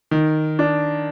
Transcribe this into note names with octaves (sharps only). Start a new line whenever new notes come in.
D#3
D4